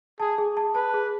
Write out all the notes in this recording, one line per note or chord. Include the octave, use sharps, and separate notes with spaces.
G#4 A5
G#4
A5
B4 A5
G#4